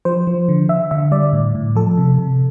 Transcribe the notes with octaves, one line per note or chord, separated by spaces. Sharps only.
F3 C5
F3
D3
D3 E5
D3 E5
G3 D5
A2
A2
F3 A4
C3
C3